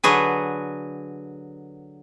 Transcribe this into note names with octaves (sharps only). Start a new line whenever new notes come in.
D3 F#3 F#4 G#4 B4